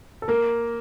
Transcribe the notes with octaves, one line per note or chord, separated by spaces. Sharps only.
A4
A#3 A#4